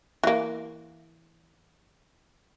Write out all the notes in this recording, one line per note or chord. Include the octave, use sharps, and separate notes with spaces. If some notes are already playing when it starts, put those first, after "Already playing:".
E3 A#3